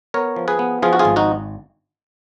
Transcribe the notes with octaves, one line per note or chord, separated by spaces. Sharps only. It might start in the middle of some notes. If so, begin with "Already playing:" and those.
B3 A#4 C#5
F3
G#4 B4
B3
F3 F4 G#4
F#4
F4 G#4
G#1
D#4 F#4